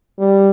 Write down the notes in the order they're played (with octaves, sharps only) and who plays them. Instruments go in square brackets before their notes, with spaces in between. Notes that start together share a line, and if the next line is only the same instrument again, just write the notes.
[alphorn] G3